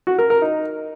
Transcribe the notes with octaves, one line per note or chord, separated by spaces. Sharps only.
F#4
A#4
A#4
D#4